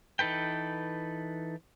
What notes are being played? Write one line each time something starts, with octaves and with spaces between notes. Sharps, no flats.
E3 D#4 A4 B4 G5